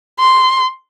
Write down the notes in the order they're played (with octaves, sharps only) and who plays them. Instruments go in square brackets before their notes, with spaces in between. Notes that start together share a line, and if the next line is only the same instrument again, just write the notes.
[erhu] C6